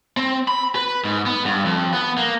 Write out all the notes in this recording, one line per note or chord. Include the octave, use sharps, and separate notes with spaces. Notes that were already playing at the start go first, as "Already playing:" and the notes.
C4
B5
B4
G#2
B3
G2
F2
B3
A#3